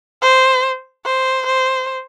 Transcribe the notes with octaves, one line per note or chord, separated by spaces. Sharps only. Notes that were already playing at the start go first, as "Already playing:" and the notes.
C5
C5
C5